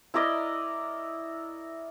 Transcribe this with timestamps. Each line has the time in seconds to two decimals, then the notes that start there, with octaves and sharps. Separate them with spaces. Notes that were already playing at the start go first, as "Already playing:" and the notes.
0.14 E4 A#4 D5 D#5